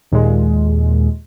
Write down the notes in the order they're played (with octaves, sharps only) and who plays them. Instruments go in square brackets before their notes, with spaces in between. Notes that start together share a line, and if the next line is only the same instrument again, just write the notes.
[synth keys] D#2 A#2 G#3